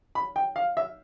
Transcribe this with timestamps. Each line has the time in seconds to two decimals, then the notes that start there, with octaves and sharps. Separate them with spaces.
0.15 B5
0.36 G5
0.56 F5
0.77 E5